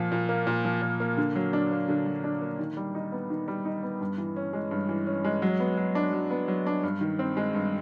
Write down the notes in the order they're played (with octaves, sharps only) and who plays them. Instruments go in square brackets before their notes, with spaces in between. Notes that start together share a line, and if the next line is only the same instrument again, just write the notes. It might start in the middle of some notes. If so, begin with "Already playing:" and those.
Already playing: [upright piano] A#2 F3
A#2
A#3
A#2
F3
A#2
A#3
D3
F#3
D4
A#3
D3
F#3
D4
A#3
D#3
G3
D#4
B3
D#3
G3
D#4
B3
G2
E3
C#4
G#3
G2
E3
C#4
G#3
F#3
B3
F#3
D4
F#3
B3
F#3
D4
G2
D#3
C4
G#3
G2